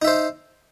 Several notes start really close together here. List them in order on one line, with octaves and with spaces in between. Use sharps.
D#4 E5 C5